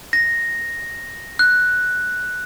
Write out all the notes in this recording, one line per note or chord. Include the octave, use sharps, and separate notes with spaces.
A#6
F#6